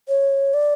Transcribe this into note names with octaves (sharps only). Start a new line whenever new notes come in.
C#5
D5